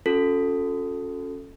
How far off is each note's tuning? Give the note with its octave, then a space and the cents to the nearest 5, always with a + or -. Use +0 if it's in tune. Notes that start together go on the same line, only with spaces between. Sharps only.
C#4 +0 F#4 -45 A4 +0